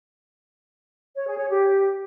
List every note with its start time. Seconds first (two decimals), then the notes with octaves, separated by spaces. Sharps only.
1.16 C#5
1.27 G#4
1.38 C#5
1.49 G4